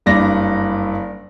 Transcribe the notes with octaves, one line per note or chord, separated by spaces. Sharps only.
F#1 G2 D5 A#6